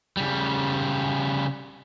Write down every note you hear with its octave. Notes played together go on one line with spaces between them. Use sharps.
C#3 G3